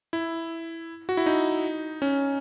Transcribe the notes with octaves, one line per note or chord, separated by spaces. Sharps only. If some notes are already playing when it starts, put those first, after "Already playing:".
E4
F#4
E4
D#4
C#4